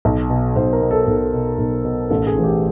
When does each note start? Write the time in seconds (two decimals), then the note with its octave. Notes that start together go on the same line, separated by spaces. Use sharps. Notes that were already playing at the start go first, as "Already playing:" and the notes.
0.05 B1
0.30 B2
0.56 B1 C5
0.73 A#4
0.82 B2
0.91 A4
1.07 B1
1.33 B2
1.58 B1
1.85 B2
2.10 A1 A4
2.27 G#4
2.35 A2 E3
2.44 G4